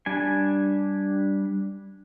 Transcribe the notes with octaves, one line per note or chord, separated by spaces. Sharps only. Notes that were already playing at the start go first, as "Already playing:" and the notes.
G3 D4 G#5